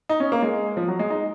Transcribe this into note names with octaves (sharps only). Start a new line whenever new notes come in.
D#4
C#4
A#3
G#3
F3
F#3
G#3
D#4